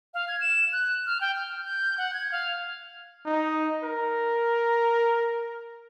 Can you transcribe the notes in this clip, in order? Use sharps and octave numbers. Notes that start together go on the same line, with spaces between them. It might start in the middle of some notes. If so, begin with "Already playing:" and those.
F5
G#6
E7
F#6
F6
G5
F6
G6
F#5
G#6
F5
D#4
A#4